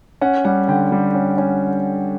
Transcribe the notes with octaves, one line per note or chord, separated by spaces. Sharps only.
C#4 F#5
G3 F#5
D3 G5
G3
C#4
C#4